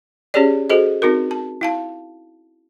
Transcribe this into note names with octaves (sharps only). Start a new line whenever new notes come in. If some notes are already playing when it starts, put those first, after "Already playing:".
C#4 G4 G#4 C#5 D5
F#4 G#4 A4 C5 D#5
C4 D#4 F#4 A#4
A5
E4 F5 A5